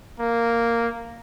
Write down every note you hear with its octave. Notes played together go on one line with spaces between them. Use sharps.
A#3